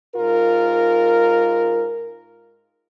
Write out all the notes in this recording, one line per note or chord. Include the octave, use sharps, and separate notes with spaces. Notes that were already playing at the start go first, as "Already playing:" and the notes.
G#2 F4 A#4